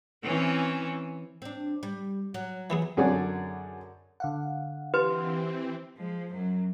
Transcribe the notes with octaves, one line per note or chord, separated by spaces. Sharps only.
E3 C4 C#4
C4 D4
G3
F#3
E3 B3 G#4
F#2 D3 G#4 C#5 D5
D3 F5 F#5
E3 C4 G4 B4 C6
F3 G#3
F#2 F#3